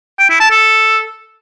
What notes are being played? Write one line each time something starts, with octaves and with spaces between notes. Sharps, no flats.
G5
E4
A5
A4